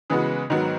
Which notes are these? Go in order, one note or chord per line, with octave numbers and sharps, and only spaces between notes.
C#3 E3 G#3 B3 F#4
G#2 D#3 F#3 B3 F#4